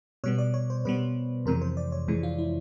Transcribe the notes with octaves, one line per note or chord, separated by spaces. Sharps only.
B2 G3 B3 C#5
D5
C#5
C5
B2 G3 B3 B4
F2 C3 E3 G#3 A#4
C5
D5
C#5
F2 C3 E3 G#3
F4
E4